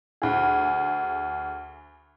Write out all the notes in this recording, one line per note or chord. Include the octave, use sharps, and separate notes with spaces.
D2 G#4